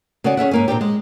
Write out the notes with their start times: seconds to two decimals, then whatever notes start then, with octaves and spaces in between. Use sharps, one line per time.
0.24 C#3 F#4 C#5 D5 F#5 G#5
0.37 C#4 G#4 E5 F#5
0.51 G#2 A#3 G#5
0.68 A#2 C4 D4 G4
0.81 G#3